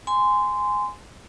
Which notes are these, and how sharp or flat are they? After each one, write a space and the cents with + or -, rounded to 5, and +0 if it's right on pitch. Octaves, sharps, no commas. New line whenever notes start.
G#5 +0 C6 -20